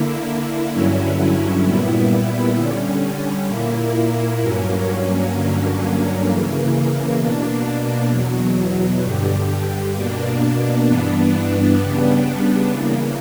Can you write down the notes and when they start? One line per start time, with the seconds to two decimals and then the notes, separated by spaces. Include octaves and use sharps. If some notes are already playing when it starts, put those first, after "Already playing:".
Already playing: D3 A#3 E4
0.71 G2 D3 F#3 C#4 E4
1.64 A#2 G3 B3 E4
2.56 D3 G3 C#4
3.48 A#2 A#3 E4
4.40 G2 F#3 A#3 C#4
5.33 G2 D3 F#3 A#3 C#4
6.25 C#3 E3 A#3
7.17 B2 A#3 D4
8.09 E2 B2 F#3
9.02 G2 D3 G3
9.94 B2 A#3 D4
10.86 G2 E3 B3 D4
11.78 C#3 G3 B3 D4
12.71 C#3 E3 A#3